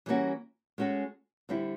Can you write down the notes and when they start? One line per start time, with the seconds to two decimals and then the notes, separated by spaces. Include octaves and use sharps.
0.06 E3 G3 A#3 C#4 F#4
0.78 G#3 C#4 F#4 A4
1.49 D3 G3 C4 E4